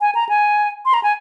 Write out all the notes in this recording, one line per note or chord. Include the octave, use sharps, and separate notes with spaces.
G#5
A#5
G#5
C6
A#5
G#5